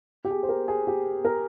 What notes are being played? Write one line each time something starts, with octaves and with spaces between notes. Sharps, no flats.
G4
G#4
C5
A#4
G#4
G4
A#4